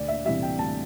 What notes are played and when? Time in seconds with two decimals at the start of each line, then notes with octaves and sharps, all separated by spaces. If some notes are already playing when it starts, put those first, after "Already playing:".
Already playing: D2 D5
0.08 E5
0.25 C3 E3 G3 E5
0.42 G5
0.59 D2 A5